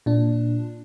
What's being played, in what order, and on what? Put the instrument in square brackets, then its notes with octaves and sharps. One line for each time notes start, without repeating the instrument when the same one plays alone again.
[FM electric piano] A#2 D4